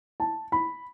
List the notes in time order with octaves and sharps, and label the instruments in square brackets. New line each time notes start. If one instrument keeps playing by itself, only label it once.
[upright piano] A5
B5